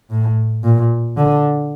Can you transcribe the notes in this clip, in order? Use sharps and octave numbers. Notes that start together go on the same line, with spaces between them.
A2
A#2
D3